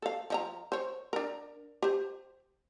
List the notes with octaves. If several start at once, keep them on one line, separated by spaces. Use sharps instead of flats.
A4 F5
F3 D#5 A#5
C5 C#5
D4 A#4
G4 C5